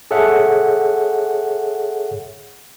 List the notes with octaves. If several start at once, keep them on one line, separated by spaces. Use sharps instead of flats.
G#4 A4 C#5 E5 F#5